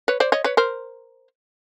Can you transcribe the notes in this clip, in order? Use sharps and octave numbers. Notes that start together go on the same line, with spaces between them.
B4 C#5
C5 D5
C#5 D#5
B4 C#5
A#4 C5